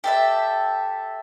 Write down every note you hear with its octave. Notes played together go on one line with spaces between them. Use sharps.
G4 A4 E5